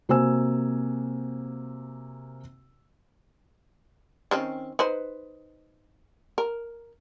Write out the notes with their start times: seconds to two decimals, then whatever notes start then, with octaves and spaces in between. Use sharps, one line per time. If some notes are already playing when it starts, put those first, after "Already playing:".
0.09 C3 A#3 F#4 C5 G#5 E6
4.31 D#3 C4 C#4
4.79 D#4 B4 C5
6.38 A#4